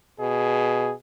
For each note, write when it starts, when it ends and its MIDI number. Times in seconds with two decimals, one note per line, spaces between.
0.20 0.91 47
0.20 0.94 68